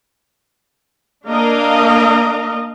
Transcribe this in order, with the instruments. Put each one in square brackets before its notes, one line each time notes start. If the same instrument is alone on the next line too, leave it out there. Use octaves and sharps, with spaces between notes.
[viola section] A#3 D4 A#4 D#5 F5